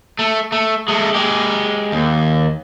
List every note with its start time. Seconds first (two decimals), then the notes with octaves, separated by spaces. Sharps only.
0.19 A3
0.52 A3
0.88 G#3 A3
1.14 G#3 G4
1.92 D#2